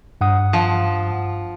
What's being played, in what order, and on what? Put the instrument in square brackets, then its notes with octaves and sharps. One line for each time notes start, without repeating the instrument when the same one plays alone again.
[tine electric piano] G2 F#5 D#6
[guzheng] F3